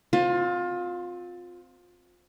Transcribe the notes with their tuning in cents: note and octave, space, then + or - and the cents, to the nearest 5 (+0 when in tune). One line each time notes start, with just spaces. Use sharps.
C4 -10 F4 +25